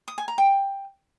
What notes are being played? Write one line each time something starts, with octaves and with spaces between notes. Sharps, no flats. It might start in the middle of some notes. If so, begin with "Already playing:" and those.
D#6
G#5
A#5
G5